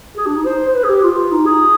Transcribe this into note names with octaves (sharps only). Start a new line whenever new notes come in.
G#4
D4
D#4
C5
C5
B4
G#4
G4
F4
D#4
G#4